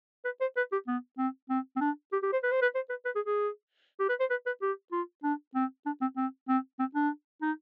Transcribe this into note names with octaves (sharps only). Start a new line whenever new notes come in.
B4
C5
B4
G4
B3
C4
C4
C4
D4
G4
G4
C5
B4
C5
B4
C5
B4
B4
G#4
G#4
G4
B4
C5
B4
B4
G4
F4
D4
C4
D4
C4
C4
C4
C4
D4
D#4